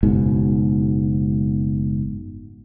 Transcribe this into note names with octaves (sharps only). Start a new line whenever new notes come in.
F#1 G#2 B2